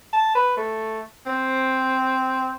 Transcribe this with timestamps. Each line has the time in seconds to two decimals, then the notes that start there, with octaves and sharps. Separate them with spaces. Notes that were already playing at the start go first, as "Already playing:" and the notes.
0.13 A5
0.35 B4
0.57 A3
1.27 C4